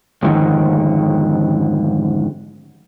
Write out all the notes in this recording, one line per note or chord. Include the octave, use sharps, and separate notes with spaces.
F2 G#2 D3 D#3